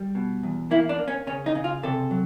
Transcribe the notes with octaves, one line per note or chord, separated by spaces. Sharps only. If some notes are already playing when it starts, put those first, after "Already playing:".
Already playing: G3
B2
E2
A#3 E4
D4
A#3
C#4
C#3 C#4
D#4
C#3
F4
C3 A4
F#3